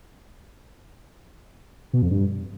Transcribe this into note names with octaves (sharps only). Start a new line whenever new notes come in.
B2
F2
G2